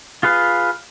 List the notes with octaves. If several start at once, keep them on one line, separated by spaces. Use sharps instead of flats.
F4 G#4 B4 F5